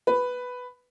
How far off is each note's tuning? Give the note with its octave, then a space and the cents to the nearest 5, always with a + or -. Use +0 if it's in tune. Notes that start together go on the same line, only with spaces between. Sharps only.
B4 +5